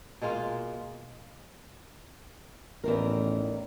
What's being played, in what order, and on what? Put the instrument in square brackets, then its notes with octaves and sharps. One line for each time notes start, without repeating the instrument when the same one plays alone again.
[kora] B2 G#3 A#3 F4
[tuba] A1 [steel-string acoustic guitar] E2 D#3 A#4